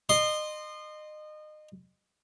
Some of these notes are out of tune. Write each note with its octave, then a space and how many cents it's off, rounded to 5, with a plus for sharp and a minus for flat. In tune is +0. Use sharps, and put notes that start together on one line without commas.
D#5 -30 C6 +0